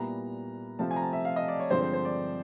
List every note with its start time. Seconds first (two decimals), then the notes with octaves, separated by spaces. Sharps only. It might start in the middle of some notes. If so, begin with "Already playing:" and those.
Already playing: A#2 G3 B3 E4 A#5
0.79 C3 F3 A3 C4 F4 A5
0.91 G#5
0.96 A#5
1.02 A5
1.13 E5
1.25 F5
1.36 D#5
1.48 D5
1.60 C#5
1.70 G2 D3 F3 G#3 C4 C5
1.82 C5
1.93 C5
2.05 D5